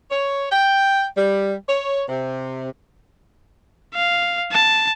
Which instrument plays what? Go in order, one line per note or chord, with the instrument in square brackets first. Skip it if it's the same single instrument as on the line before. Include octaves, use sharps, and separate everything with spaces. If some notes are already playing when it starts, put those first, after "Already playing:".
[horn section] C#5
G5
G3
C#5
C3
[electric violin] F5
A5